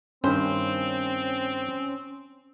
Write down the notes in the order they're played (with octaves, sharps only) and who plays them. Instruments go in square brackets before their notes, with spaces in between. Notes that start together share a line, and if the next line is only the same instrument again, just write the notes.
[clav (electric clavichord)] G2 D#3 [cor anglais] C4 [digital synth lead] C#4 [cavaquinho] C5